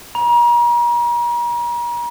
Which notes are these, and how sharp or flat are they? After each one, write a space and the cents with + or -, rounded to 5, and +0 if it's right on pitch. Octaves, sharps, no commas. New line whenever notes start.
A#5 +40